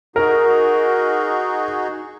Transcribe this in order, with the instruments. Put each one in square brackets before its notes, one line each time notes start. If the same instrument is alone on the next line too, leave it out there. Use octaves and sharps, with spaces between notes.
[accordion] D#4 F#4 G#4 [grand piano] A#4